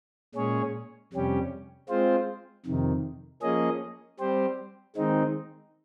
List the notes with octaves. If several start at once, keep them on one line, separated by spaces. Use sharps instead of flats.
A#2 G#3 C#4 G#4 C#5
F2 C3 G3 C#4 G4
G#3 C4 F4 C5
F2 C3 D#3
F3 A#3 C#4 G#4 D#5
G3 C4 G4 C5
D#3 G#3 C4 D#4